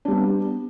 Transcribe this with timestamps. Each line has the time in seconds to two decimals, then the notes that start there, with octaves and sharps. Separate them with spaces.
0.05 D4
0.08 G3
0.11 B3